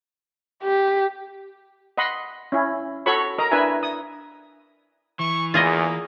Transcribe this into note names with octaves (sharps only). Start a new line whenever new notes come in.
G4
D#5 F#5 B5 C6
C#4 E4
F#4 A4 C#5 B5 C#6
A#4 D#5 A#5
D4 E4 A#4 B4 E5 G#5
D#6
E3 C#6
E2 A#3 F4 G#4 D#5